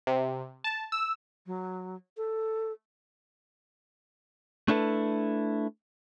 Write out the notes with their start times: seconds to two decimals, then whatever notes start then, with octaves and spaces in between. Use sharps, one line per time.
0.07 C3
0.64 A5
0.92 E6
1.46 F#3
2.17 A4
4.68 A3 D4 E4 A4 B4